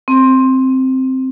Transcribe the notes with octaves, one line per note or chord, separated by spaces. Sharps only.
C4